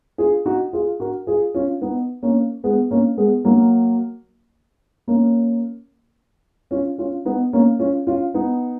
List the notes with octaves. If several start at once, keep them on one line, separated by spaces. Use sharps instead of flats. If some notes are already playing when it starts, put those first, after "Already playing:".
F4 G#4
D#4 F#4
F4 G#4
F#4 A#4
F4 G#4
C#4 F4
B3 D#4
A#3 C#4
G#3 B3
A#3 C#4
G#3 B3
F#3 A#3
A#3 C#4
C#4 F4
C#4 F4
B3 D#4
A#3 C#4
C#4 F4
C#4 F4
B3 D#4